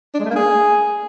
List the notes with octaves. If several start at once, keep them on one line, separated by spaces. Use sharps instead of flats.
D4
G#3
A3
A#3
G#4